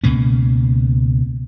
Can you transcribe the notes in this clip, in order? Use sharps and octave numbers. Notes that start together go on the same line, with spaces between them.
C#2 B2 A#3 C#4